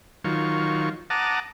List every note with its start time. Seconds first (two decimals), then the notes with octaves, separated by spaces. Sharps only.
0.24 D#3 F#3 F4 C#6
1.10 F#5 A5 A#5 D6 D#6